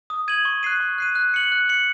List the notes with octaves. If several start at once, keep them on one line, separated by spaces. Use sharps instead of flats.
D#6
G#6 D#7 F#7
C#6
F#6 C7 D#7
C#6
F#6 C7 D#7
F#6
C#7 F#7
F#6
C#7 F#7